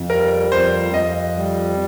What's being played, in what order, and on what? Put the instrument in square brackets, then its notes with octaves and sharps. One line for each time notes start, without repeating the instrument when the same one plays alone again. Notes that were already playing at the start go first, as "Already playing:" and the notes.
Already playing: [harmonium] F2
[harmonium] G3 [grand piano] A#4
[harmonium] F2 [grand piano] C5
[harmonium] F2 [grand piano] D#5
[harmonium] G3